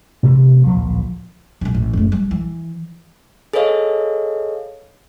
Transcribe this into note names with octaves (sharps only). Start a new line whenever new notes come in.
A1 B2 A3 C4
D1 A#1 A#2 F3
E1 B1
A1
F#1 A3
G3
E3
G#4 A4 B4 C#5 D#5 F5